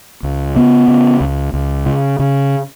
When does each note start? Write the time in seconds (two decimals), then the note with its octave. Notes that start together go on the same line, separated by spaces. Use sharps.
0.23 C#2
0.56 C#3 B3
0.88 C#3
1.20 C#2
1.53 C#2
1.86 C#3
2.19 C#3